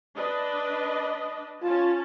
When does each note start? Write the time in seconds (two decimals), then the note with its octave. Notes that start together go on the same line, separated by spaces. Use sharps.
0.15 D4 B4 D#5
1.63 C#4 F4 A5